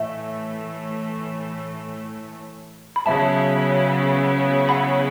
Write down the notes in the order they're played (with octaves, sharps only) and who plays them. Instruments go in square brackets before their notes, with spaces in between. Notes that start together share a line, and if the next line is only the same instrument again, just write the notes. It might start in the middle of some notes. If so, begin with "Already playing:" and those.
Already playing: [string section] A2 E3 A3 [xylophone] E5
[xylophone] B5
[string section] C#3 F#3 B3 E4 [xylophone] E5 A5
[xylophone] F#5 B5